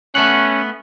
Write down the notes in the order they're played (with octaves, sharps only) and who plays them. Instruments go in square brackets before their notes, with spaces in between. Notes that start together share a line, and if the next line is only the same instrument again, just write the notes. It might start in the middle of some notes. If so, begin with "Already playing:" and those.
[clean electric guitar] A3 B3 F#5 [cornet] C#4